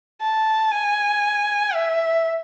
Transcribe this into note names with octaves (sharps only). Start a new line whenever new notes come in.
A5
G#5
E5